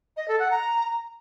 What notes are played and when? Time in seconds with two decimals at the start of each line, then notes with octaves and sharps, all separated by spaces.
0.17 D#5
0.28 A4
0.39 F#5
0.51 A#5